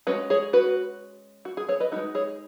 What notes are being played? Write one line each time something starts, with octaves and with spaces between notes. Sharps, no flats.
G#3 C#4 F#4 B4
G#4 C#5
F#4 B4
F#4
G#4
G#4 C#5
B4 D#5
G#3 B3 D#4 F#4 B4
G#4 C#5